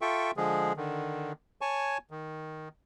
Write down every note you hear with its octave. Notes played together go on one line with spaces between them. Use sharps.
F4 A4 E5 G5 C#6
D3 F3 G#3 G#4
D3 D#3
C#5 G#5 A5 C#6
D#3